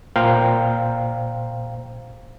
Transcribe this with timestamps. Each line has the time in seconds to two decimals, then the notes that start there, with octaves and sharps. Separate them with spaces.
0.16 A#2 C5 F5 G5 A#5